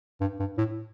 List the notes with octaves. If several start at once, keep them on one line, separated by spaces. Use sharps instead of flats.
G2
G2
A2